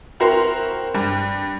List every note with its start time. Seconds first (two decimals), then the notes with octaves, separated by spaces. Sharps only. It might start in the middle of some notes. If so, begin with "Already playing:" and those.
0.20 C4 E4 F#4 A#4 C5
0.95 G2